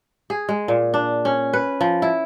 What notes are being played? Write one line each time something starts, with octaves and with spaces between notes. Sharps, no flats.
G#4
G#3
A#2
D4
C#4
B4
F3
E4